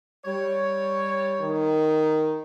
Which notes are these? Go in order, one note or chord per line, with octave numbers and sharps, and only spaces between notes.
G3 C#5
D#3